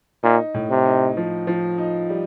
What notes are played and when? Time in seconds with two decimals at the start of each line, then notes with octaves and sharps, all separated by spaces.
0.23 A#2 D#4
0.54 A2
0.70 C3
0.85 D#4
1.17 F3
1.47 F3
1.78 D#4
2.10 G3